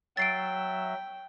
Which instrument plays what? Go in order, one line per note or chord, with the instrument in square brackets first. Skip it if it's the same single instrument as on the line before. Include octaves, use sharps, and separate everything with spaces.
[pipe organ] F#3 E5 [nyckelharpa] G5 [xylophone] A6 C7 D7